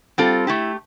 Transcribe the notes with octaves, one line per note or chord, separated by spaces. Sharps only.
G3 C4 F4 A4
A3 E4 G4